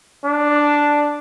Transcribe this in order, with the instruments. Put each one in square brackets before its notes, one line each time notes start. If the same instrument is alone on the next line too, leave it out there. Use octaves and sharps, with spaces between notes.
[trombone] D4